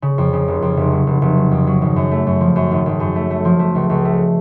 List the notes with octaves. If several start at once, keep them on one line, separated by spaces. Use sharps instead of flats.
C#3
F2
C#3
F1
F2
F1
F#3
F1
F1
F#3
F2
F#3
G#1
F#2
A3
F#2
F3
F#2
G#1
G#1
F#2
A3
A3
F3
A3
C#2
C#2
A3